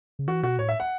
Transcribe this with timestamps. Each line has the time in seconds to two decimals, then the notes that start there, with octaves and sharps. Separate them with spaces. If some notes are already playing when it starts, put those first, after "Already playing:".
0.19 C#3
0.28 E3 F#4
0.43 B2 F#4
0.58 A2 C#5
0.69 E5
0.80 F#5